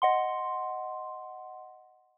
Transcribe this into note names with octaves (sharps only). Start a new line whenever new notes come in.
D#5 F#5 C6